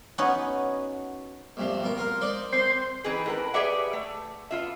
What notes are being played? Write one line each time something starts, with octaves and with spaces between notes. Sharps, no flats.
B3 C#4 D#4 F#4 B4 C#5
A#1 G2 C3
B2 A#4
F4 A#4
D#4 C5 D5
C4 C5
E3 C4 D#4 G#4 B4
A2 A#4 B4
G4 G#4 B4 D5 E5 F#5
A3
B3 F4 E5